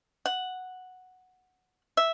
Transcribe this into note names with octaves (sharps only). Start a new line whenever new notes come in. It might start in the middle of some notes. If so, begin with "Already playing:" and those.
F#5
E5